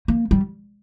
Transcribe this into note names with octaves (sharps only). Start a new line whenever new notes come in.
A#3
G3